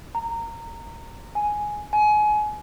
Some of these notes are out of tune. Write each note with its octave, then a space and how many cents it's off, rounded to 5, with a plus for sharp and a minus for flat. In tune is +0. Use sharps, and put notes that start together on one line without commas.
A#5 -20
G#5 +5
G#5 +25